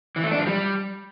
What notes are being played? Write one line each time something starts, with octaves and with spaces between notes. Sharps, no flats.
E3
A3
D4
F3
G3